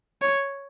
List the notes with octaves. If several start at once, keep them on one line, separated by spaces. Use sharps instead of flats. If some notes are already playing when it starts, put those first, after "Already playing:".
C#5